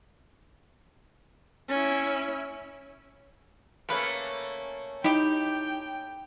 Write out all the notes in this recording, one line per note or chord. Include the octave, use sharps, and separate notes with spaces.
C#4 E4
C#3 A3 A#3 C#4 B4
D#4 E4 G4 G5